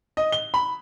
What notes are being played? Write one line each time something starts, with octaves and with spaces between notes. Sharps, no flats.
D#5
G7
B5